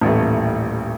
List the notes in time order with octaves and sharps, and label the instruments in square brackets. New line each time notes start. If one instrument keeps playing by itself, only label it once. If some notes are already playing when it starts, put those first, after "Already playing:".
[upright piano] D#1 A1 E3 A3